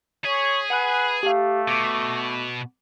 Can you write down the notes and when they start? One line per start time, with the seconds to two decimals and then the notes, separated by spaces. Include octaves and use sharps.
0.25 G#4 C#5 B6
0.70 B4 F#5 G#5 F#6
1.23 A3 G4 F5
1.68 B2 D6